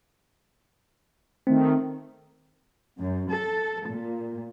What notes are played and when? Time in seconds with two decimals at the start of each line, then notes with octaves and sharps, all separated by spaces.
1.47 D#3 A3 C4
2.98 F#2
3.30 A4
3.88 A#2